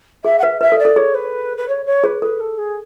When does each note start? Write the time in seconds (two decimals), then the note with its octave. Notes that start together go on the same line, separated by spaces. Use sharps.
0.24 G#4 E5
0.39 F#5
0.43 B4 E5
0.61 B4 E5
0.72 A4
0.79 D5
0.85 A4
0.96 G#4 C#5
1.14 B4
1.57 B4
1.68 C#5
1.86 C#5
2.04 G#4 B4
2.22 A4 B4
2.40 A4
2.58 G#4